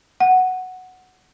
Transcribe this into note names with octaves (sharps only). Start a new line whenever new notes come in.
F#5